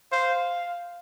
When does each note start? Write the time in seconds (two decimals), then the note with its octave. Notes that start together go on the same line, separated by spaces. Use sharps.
0.12 C5 F5